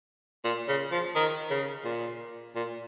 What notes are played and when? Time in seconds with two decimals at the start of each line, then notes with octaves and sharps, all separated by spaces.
0.44 A#2
0.68 C#3
0.91 F3
1.15 D#3
1.50 C#3
1.85 A#2
2.55 A#2